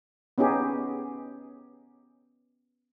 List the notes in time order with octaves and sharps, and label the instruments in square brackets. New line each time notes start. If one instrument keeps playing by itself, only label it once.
[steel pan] B3 C#4 D#4 G4 G#4